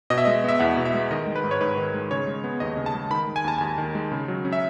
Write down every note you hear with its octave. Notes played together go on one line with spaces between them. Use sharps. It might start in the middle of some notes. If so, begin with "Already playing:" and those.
B2 D#5
E5
G#3 D#5
B3 E5
E2 F#5
B2
E5
G#3
D#3 D#5
G#3
B4
G#2
C#5
G#2 B4
D#3
G#3
C#3 C#5
G#3
B3
D#2 D#5
C#3
A5
G#3
D#3 B5
G#3
G#5
D#2 A5
D#2 G#5
D#3
G#3
C#3
F#3
C#4
E5